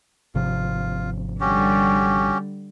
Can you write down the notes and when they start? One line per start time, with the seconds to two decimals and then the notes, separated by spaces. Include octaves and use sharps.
0.35 G#1 C3 F3 F4
1.40 D3 G3 C#4 F#4 G4